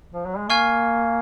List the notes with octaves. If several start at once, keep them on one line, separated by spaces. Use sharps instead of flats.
F3
F#3
G#3
A#3 G#5 C#6 F6 G#6 C7